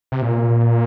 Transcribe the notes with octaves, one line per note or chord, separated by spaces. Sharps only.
C3
A#2